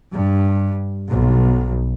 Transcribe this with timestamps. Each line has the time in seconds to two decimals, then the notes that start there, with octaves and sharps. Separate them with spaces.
0.14 G2
1.11 B1